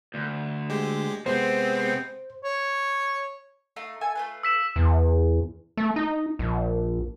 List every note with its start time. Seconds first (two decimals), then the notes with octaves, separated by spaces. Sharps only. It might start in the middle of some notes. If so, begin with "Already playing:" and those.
0.15 D2
0.70 G#3 G4
1.26 C3 G#3 B3 C4 C5
2.43 C#5
3.76 A3 D#4 F5
4.01 A4 E5 G#5
4.15 A3 F4 B4
4.43 E6 B6 E7
4.76 E2
5.77 A3
5.96 D#4
6.39 A#1